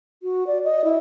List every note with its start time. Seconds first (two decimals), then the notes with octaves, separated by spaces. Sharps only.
0.23 F#4
0.47 D5
0.64 D#5
0.84 E4